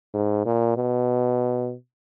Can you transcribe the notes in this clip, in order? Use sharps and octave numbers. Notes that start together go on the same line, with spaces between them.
G#2
A#2
B2